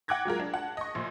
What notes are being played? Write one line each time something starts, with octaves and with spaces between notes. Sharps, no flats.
F#5 G5 D6 F#6 G#6 A#6
F#3 G#3 F4 A#4
D4
F#5 A5
D#5 C#6
A#1 A#2